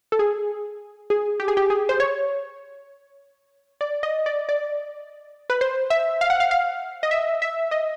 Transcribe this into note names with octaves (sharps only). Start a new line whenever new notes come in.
A4
G#4
G#4
G4
G#4
G4
G#4
C5
C#5
D5
D#5
D5
D5
B4
C5
E5
F5
F#5
F5
F5
D#5
E5
E5
D#5